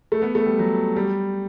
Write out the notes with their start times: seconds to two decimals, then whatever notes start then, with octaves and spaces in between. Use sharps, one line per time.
0.12 A3
0.22 B3
0.35 A3
0.46 G3
0.59 F#3
0.96 G3